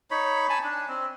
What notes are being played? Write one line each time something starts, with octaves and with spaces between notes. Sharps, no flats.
D#4 C#5 B5
G#5 A5 B5
D4
C4